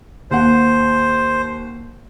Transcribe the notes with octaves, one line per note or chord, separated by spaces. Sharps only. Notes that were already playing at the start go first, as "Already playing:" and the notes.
D#2 C5 F#5